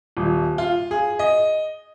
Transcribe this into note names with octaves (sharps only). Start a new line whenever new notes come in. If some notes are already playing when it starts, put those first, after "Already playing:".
D#1
F4
G#4
D#5